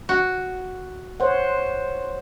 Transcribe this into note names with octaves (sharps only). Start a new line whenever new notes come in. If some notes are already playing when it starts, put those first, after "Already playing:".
F#4
C5 C#5 F#5